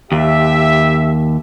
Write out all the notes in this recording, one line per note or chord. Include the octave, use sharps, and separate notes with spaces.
D#2 G4 E5